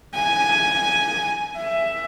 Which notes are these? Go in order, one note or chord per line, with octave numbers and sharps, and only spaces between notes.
G#5
E5